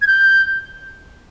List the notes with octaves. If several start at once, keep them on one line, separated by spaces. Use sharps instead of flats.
G#6
G6